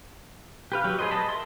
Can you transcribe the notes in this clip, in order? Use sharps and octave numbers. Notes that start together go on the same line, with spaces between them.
G4 B4 F5
F#3 G4
G#4 A4 B4 C5 D#5
D#5 A5 B5
A#4 E5 C6